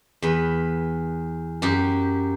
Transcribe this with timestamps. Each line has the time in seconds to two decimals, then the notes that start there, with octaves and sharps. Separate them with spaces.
0.22 E2 B4
1.62 F#2 G4